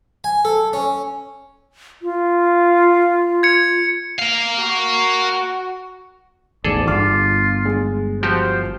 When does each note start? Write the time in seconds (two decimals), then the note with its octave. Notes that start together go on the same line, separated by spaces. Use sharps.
0.24 G#5
0.45 A4
0.73 C#4
2.02 F4
3.43 G#6 C#7
4.19 A#4 F5
4.59 F#4
6.64 A1 E2 G#2 G#4 A4 D5
6.87 G1 F4 D6 F6
7.65 G#3
8.23 F3 F#4 G4 C5